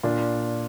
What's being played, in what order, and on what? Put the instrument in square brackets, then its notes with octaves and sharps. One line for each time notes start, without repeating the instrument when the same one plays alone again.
[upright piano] A#2 [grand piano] D4 F4